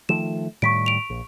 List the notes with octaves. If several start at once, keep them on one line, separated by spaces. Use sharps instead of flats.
D#3 F3 A3 E7
A2 D#3 G3 C#6 B6 D7
D7 F7
A#1